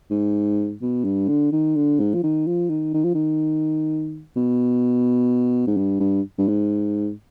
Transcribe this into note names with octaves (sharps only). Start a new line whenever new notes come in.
G#2
B2
G2
D3
D#3
D3
G#2
F3
D#3
F3
D#3
D#3
F3
D#3
B2
G#2
G2
G2
G2
G#2